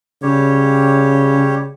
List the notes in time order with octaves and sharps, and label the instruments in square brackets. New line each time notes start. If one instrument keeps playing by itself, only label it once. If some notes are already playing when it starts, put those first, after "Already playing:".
[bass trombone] C#3 [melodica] G3 G4 C#5